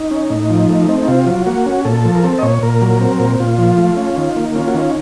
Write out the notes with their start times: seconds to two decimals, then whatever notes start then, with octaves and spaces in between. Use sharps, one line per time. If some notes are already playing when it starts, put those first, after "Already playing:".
Already playing: D#4
0.11 C#4
0.30 A2
0.50 F3
0.69 A3
0.89 C4
1.02 D#4
1.08 C3 F4
1.27 F#3
1.46 A#3 F#4
1.66 C#4
1.85 A#2 A4
2.05 F3
2.15 A#4
2.23 C4 A4
2.38 D#5
2.42 A#2 C#5
2.63 A#2 A#4
2.82 F#3
3.01 C4
3.20 A#2
3.40 A#2 F4
3.58 F3
3.78 A3
3.97 C#4
4.17 D#3
4.37 A#3
4.55 C#4 F4
4.68 F#4
4.74 D#3 F4